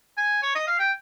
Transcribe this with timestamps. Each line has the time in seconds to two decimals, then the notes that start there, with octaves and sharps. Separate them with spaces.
0.18 G#5
0.42 C#5
0.55 D#5
0.67 F5
0.79 G5